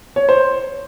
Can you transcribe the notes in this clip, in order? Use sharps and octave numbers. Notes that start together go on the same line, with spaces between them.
C#5
C5